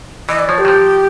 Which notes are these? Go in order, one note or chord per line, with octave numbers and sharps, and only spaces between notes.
E3 D#5
D5
F3 C#5
G4
F#3
F3